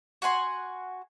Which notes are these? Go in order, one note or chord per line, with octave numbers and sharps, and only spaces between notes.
F#4 F#5 G#5 C6